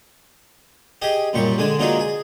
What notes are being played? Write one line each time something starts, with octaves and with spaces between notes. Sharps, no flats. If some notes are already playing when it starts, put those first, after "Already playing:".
G4 G#4 D#5
F#2 A#2 G3 C#6
D3 G#3 D4 G#5
F#3 A#3 D4 D#4 F4 G#4
G#4